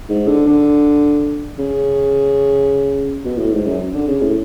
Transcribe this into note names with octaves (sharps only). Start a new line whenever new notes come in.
G#2
D3
D3
C#3
B2
A2
G#2
F#2
D3
C#3
A2